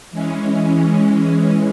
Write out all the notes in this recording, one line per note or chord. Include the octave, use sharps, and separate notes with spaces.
E3 G#3 C#4